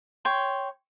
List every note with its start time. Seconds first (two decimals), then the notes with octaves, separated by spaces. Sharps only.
0.25 C#5 G5 C6